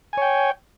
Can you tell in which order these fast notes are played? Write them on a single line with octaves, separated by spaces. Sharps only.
G#5 C#5 G5